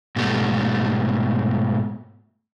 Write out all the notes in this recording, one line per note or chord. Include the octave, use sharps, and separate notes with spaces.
G#2 B2 G3 A3